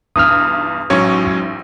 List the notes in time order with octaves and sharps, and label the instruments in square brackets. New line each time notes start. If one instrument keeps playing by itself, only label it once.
[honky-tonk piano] B1 E2 G2 [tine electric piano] D#6 F6
[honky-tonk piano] A1 G#2 C#6 [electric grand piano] F#3 C#4 C#5